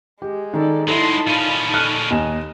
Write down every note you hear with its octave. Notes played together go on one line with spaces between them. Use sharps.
G#3 G4
D#3 A4 D5
F#3 G#3 D#4 E4 A4 A5 B5 C6
A#2 C#4 F4
A4 F6 F#6
D#2 D#5 G#5 E7